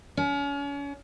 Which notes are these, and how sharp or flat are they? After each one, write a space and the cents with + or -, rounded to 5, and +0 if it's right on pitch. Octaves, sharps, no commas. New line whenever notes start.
C#4 +35